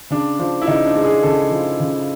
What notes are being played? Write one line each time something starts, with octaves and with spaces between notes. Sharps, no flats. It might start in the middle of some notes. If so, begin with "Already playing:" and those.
C#3 D4
F3 D4
E4
C#3 D#4
D4
G#3
G#4
C#3 A4
F3
C#3